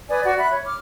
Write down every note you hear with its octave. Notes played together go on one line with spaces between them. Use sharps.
B4 D5 G#5 D#6
F#4 D5
E5 B5 F#6
C#5
D6 F6